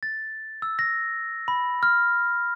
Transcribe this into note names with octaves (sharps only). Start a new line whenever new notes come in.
A6
E6
A#6
B5
F6